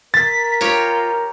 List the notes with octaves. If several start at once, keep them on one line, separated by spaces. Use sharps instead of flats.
A#4 A6 B6
F4 G4 C#5